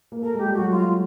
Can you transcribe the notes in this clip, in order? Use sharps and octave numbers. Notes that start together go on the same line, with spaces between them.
A#3
A3 A#4
G#3 G4
G3
F#3 F#4
F4